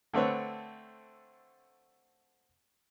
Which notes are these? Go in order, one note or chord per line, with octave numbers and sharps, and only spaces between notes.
D3 A3 C4 B4 C#5